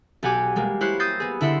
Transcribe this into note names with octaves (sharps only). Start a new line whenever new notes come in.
B1 G4 F#5 G#5 D6
G3 G#3 A#3
E4 G4 C5 C#5 F#6 C7
D#6 E6 G6 A6 A#6 C7
B3 G#4
D3 E4 E5 F#5 C6